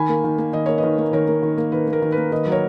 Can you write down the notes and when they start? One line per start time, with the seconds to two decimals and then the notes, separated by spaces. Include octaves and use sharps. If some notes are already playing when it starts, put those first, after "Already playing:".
Already playing: D#3 G#5 B5
0.09 A#3
0.24 D#3
0.38 A#3
0.53 D#3 D#5
0.66 A#3 C#5
0.78 B4 D#5
0.83 D#3
0.98 A#3
1.13 D#3 A#4 C#5
1.28 A#3
1.42 D#3
1.57 A#3
1.72 D#3 B4
1.88 A#3
1.93 A#4
2.02 D#3
2.12 A#3 B4
2.32 D#3 B4 D#5
2.46 F#3
2.52 A#4 C#5